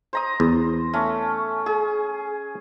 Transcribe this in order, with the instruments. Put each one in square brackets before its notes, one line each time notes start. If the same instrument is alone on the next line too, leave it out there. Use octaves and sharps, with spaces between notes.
[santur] C5 A#5 D#6
[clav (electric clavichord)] E2
[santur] A3 C#4
G#4